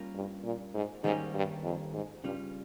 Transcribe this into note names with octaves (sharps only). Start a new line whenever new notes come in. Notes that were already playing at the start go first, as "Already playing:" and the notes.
Already playing: G3 A#3 C#4 F4 A#4
G2
A#2
G#2
G#2 D#3 G3 A#3 C#4 G4
G2
F2
G#2
G2 C#3 G3 C#4 F4